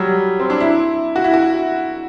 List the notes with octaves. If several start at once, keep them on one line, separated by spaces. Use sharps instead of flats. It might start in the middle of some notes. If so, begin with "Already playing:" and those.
Already playing: F#3 G3
C4
D4
E4
F#4
E4
F#4